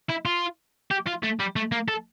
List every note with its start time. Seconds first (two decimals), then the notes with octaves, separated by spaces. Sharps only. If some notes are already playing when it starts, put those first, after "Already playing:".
0.09 E4
0.25 F4
0.91 G4
1.07 F4
1.23 A3
1.39 G3
1.56 A3
1.72 A#3
1.88 A4